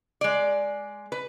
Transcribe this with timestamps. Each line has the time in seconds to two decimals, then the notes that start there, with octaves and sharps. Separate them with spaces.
0.21 G#3 D5
1.12 B4